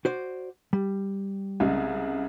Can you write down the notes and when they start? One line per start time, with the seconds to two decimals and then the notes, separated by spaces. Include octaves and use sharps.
0.05 F#4 C5 D5
0.73 G3
1.60 C2 C#3 G#3